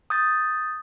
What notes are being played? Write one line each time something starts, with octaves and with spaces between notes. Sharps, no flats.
D#6 G6 A6